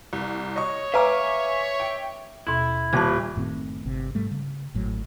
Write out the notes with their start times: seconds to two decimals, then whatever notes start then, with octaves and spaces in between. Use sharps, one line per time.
0.13 C2
0.56 C#5 D#5 C#6
0.94 B4 E5 F5 G#5 A#5 D6 E6
1.80 G5
2.47 D#2 B2 E4
2.93 D#1 A5 G#6
3.36 F#1 A2 D#3 C4
3.85 G1 C3
4.15 G#2 G3 A3
4.31 C#3
4.74 G#1 A2 F#3